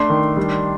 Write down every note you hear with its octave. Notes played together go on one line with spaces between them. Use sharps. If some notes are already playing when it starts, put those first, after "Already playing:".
Already playing: A3 D4 C6
D#3
G3